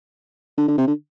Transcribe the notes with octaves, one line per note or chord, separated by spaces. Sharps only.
D3
D3
C3
D3